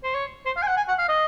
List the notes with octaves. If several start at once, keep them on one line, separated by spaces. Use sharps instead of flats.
C5
C#5
C5
F5
G#5
F#5
G#5
F#5
F5
D#5